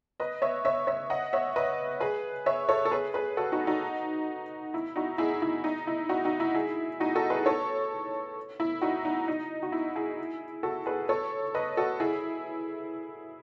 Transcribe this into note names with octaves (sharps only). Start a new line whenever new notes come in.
B4 D#5
C#5 E5
C#5 E5
C#5 E5
D#5 F#5
C#5 E5
B4 D#5
G#4 B4
C#5 E5
A4 C#5
A4
G#4 B4
G#4 B4
F#4 A4
D#4 F#4
D#4 F#4
E4
D#4 F#4
E4 G#4
E4
D#4
E4
D#4 F#4
D#4 F#4
E4
E4 G#4
D#4 F#4
F#4 A4
G#4 B4
A4 C#5
E4
D#4 F#4
D#4
D#4
F#4
E4
E4 G#4
F#4 A4
G#4 B4
A4 C#5
B4 D#5
F#4 A4
E4 G#4